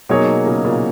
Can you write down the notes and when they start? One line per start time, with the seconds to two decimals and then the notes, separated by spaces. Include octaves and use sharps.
0.09 B2 F#3 A#3 D#4 G#4 C#5
0.27 B2
0.46 A#2 C#3
0.64 A#2 C#3